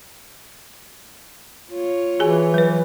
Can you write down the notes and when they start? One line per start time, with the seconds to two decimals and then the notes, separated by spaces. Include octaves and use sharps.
1.72 F4 C#5
2.20 E3 F#4 G#4 G#5
2.54 F#3 B4